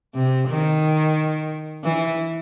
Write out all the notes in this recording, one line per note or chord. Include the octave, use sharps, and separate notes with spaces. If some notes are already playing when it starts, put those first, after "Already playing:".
C3
D#3
E3